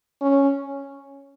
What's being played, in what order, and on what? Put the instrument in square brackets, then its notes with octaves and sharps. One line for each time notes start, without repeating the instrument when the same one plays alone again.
[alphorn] C#4